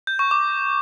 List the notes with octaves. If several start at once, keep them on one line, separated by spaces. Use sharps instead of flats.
G6
C#6
D6